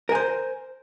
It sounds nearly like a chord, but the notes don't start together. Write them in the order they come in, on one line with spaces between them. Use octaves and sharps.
A#4 G#5 C5